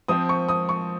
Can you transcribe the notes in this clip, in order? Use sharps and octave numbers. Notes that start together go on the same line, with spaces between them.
F3 C4 D#6
C#6
D#6
C#6